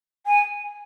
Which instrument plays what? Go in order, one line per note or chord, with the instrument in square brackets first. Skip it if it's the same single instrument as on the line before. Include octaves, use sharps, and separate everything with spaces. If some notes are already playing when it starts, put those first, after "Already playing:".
[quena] G#5